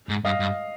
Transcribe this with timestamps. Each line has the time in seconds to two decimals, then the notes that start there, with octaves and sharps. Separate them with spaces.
0.09 G#2
0.25 G2 D#5 F5
0.40 G2